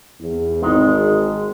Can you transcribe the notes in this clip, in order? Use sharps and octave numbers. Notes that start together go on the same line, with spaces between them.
E2
G#1 D#3 G#3